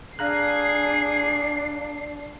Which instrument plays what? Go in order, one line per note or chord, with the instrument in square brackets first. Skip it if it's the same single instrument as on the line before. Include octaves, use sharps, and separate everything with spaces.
[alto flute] D4 [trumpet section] G#4 [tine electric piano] F5 A#5 F#6 [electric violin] C7